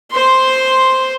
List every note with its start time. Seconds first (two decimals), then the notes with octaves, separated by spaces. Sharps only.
0.11 C5 C6